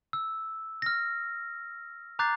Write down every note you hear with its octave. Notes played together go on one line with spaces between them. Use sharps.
E6
F6 A#6
A#5 D6 F#6 G6 A6 C7